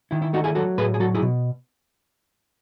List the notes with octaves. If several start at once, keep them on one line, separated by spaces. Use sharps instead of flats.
D#3 E4
E4
A3 D#4 F#4
E4 G#4
F#3 F#4 A4
A2 G#4 B4
G#4
F#3 F#4 A4
E4 G#4
B2